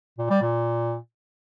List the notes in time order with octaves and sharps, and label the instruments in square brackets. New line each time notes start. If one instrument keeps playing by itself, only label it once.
[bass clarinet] A#2
G3
A#2